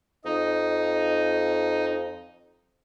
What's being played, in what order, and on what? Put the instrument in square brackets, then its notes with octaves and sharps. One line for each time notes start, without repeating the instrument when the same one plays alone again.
[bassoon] F2 [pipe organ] D#4